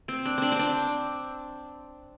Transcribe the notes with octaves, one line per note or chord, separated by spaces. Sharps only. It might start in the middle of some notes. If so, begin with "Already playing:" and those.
C4
D4
C4 D4
C4
D4